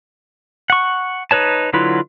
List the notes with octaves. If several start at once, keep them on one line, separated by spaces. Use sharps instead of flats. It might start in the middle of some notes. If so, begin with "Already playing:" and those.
F#5 C#6
D#4 B4 C#5 A5
D3 F#3 E4 F4 B4